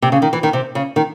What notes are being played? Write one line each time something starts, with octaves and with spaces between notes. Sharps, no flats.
C3
C#3
D#3
E3
D#3
C3
C#3
D#3